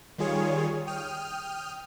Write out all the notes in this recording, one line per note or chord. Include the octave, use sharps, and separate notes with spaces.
D#3 G3 F4 G#4 C#5
G5 D#6 F6